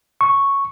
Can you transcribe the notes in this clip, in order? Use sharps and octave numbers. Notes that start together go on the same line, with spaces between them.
C#6